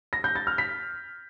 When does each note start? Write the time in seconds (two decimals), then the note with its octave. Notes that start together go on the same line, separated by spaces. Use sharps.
0.13 A#6
0.24 G6
0.35 A6
0.47 F6
0.58 B6